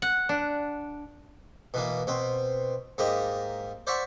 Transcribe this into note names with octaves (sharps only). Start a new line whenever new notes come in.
F#5
D4
B2 E3 A#3
B2 C4
G#2 A#3 G4 D#5
C5 D5 E5 F#5 C#6